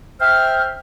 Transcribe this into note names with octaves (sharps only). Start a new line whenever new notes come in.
C5 E5 G5 F6